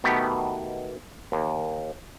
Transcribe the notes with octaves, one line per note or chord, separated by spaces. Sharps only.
B2 D#3 A3 B3 G4
D#2